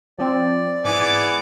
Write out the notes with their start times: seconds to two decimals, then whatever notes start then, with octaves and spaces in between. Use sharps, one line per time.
0.19 F3 C4 D5
0.85 G#2 E3 B3 G#4 D6